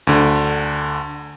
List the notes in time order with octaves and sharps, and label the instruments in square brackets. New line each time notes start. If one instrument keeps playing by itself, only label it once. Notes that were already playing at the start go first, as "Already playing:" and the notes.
[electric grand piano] D2 D3